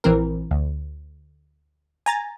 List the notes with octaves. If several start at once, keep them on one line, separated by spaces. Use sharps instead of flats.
A#1 E3 C4 A#4
D2
G#5 A#5 A6